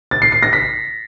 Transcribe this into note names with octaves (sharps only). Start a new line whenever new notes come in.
A6
C7
C7
A#6
B6